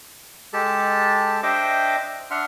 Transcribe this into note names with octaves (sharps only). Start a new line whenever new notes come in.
G#3 G4 A4 A5
D4 C5 D#5 E5 G5 D6
D4 E5 F#5 C6 F6